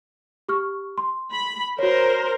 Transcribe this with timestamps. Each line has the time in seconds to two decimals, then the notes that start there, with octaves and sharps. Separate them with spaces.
0.49 G4 C#6 F6
0.98 C6
1.32 B5
1.79 F#4 A#4 C5 C#5